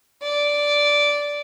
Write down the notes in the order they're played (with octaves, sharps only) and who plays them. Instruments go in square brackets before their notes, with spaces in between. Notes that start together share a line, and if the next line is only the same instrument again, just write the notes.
[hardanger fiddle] D5